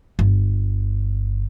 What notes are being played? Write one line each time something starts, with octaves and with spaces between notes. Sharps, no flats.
G1